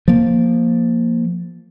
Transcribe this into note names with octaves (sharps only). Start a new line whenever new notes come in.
F3 A#3